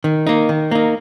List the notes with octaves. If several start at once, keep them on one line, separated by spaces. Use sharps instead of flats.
D#3
A#3 D#4
D#3
A#3 D#4